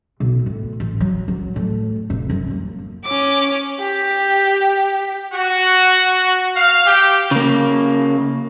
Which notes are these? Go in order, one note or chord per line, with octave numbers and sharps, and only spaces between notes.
B1
A2
A1
F#3
F#3
A2
F1
F#2
A#3
C#4 D6
G4
F#4
F5
G4
C#3 A#3